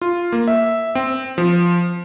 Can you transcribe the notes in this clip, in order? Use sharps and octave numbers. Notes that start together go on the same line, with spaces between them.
F4
A#3
E5
C4
F3